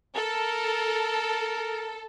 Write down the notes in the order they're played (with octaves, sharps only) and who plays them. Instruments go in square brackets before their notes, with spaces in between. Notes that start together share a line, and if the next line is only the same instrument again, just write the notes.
[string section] A4 [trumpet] A#4